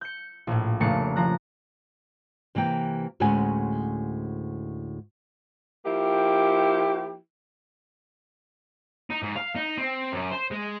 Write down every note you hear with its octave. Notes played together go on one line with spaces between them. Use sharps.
G6 C#7
A#1 A2
F1 C#3 A3 A#3 D4 C#7
F3 A#5 F#6
C3 E3 A#3 G5
D2 A2 G#3 C#4 F#5 G#5
F3 A#3 E4 G4
D#4
G#2
F5
D#4
C4
F#2
C5
G#3